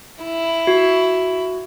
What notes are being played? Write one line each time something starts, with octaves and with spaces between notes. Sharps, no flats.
E4
F#4